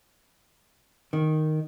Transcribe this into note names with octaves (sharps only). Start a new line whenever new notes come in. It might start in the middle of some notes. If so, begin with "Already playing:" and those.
D#3